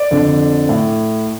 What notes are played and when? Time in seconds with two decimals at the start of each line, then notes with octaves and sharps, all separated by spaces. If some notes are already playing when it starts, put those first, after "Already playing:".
Already playing: D5
0.11 F2 D3
0.69 A2